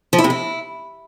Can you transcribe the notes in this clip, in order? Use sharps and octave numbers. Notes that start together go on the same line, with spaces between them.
F3
E4
C3
E4